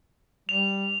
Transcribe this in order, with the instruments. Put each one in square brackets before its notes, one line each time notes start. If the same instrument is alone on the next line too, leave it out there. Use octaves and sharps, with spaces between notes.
[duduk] G3 [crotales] F7